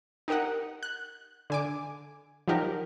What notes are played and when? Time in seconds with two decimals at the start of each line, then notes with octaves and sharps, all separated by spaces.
0.28 D#4 G4 A#4 D#5 F#5
0.83 F#6
1.50 D3 G#5 D6
2.48 F3 F#3 D#4 G4 A#4